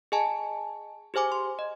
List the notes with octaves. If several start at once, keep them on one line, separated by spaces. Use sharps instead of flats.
G#4 D#5 G#5 A5
G4 G#4 C5 G#5 D6
C6
D#5